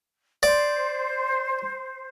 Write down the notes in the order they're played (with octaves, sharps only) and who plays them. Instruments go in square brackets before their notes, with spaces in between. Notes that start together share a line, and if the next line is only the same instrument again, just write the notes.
[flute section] C5 [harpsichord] D5